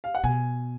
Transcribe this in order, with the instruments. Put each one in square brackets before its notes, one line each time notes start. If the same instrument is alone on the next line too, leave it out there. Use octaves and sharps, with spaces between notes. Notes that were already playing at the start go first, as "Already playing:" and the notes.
[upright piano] F5
F#5
[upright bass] B2 [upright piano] G#5